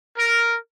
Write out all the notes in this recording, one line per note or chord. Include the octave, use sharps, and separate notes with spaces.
A#4